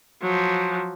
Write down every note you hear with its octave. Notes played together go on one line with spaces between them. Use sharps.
F3 F#3